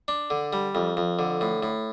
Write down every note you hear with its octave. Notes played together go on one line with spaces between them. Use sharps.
D4
D3
G3
F2
F2
D3
A2
A2